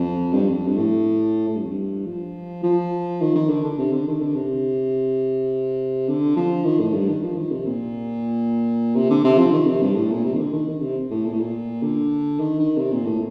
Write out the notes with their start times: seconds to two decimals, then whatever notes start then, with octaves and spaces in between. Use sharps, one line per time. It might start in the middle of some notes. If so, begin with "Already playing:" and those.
Already playing: F2
0.33 G2
0.48 F2
0.67 G2
0.77 A2
1.48 A2
1.56 G2
1.63 F2
1.71 G2
2.06 F3
2.63 F3
3.21 D#3
3.35 D#3
3.49 D3
3.64 D3
3.78 C3
3.92 D3
4.07 D#3
4.21 D3
4.35 C3
6.08 D3
6.36 F3
6.65 D#3
6.80 A2
6.94 G2
7.09 D#3
7.23 F3
7.38 D#3
7.51 C3
7.66 A#2
8.95 C3
9.10 D3
9.24 C3
9.38 F3
9.53 D#3
9.67 C3
9.82 G2
9.95 A2
10.11 A#2
10.25 C3
10.34 D#3
10.39 D3
10.53 D#3
10.68 D#3
10.82 C3
11.10 A2
11.25 A#2
11.32 A2
11.40 A#2
11.82 D3
12.40 D#3
12.59 D#3
12.78 C3
12.92 A#2
13.05 A2